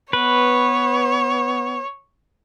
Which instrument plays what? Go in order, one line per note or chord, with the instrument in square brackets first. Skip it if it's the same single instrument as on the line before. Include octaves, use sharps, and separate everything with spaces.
[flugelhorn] B3 [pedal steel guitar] B4 [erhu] C#5